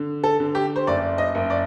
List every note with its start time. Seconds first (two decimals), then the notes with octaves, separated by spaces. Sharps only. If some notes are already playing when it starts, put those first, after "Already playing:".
Already playing: D3
0.24 A4
0.40 D3
0.55 G4
0.76 C5
0.87 F#1 D5
1.18 D#5
1.35 F#1
1.50 D5